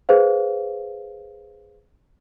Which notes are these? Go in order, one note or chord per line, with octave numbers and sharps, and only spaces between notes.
G#4 B4 C5 F5